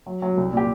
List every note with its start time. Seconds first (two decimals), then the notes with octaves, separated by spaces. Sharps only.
0.06 F#3
0.22 F#3
0.37 C2
0.53 A#2 G4